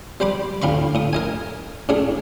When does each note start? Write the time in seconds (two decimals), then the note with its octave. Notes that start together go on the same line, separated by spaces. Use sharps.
0.20 G3 C5 B5 D6
0.62 D2 A2 F5 B5 C#6
0.95 A2 D#6
1.13 A#4 D#5 G#5
1.89 A2 C#4 D4 G#4